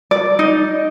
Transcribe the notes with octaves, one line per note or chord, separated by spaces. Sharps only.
D5
D#4